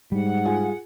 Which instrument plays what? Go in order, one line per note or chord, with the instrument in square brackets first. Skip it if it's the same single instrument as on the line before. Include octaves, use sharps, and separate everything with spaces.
[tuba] G#2 [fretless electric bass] G3 [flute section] F#5
[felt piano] F4 G#4 G#5